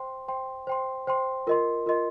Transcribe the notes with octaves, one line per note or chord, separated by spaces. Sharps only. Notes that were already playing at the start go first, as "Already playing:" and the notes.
Already playing: C5 G5 C6
C5 G5 C6
C5 G5 C6
C5 G5 C6
F4 A#4 D#5 C6
F4 A#4 D#5 C6